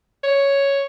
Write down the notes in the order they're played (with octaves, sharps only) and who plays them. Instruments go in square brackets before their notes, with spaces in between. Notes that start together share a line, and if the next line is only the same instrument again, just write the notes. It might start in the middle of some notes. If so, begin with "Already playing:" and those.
[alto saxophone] C#5